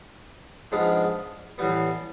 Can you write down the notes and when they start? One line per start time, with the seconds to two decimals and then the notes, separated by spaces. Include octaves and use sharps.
0.72 G#2 F3 G#3 B3 D4
1.58 A2 E3 G3 B3